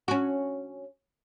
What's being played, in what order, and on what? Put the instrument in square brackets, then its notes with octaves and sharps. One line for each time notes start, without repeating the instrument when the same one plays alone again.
[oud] C#4 F#4